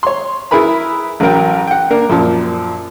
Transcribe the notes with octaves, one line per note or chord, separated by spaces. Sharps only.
C#5 C6
E4 G#4 A#4 B4 B5
A1 F#3 A#4 G5
F#5 G5
A#3 D4 A#4
F#2 A#2 F3